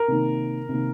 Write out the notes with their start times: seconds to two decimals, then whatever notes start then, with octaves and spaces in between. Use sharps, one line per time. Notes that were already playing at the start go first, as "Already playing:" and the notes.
Already playing: A#4
0.08 C3 D#3 A#3
0.69 C3 D#3 A#3